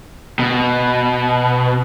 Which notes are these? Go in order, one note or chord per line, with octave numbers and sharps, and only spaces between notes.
B2